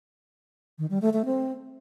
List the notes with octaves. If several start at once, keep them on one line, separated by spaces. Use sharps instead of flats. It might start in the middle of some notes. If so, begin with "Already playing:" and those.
D#3
G3
A3
A3
C4